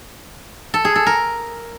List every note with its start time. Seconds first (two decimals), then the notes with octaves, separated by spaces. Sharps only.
0.74 A4
0.85 G#4
0.96 A4
1.06 A#4